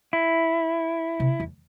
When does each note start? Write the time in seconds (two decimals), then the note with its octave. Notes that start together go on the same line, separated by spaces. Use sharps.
0.13 E4
1.20 C3
1.40 E2